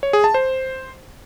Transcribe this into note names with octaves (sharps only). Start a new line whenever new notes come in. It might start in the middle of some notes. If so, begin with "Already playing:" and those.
C#5
G#4
A5
C5